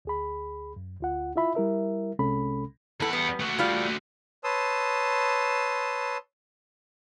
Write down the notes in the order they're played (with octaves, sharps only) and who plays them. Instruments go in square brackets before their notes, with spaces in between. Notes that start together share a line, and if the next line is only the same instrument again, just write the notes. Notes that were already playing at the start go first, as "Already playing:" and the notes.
[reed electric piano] D2 G#4 B5
F#2
D2 F4 F#5
E4 F4 E5 B5
G3 E4 A#4 E5
C2 C3 G#3 C#4 A4 B5
[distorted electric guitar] E2 F#5 [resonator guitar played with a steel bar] E3 A4
[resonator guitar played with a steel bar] G3 B3
[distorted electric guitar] A3 F#4
[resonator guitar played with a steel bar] G3 F4 D5
[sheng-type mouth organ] B4 C#5 A5 C6 D#6 E6